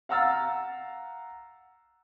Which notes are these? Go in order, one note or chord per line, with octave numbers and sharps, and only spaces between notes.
F5 F#5 A#5 E6 F6 A6